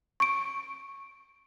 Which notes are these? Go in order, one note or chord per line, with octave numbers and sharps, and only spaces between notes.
C#6 D7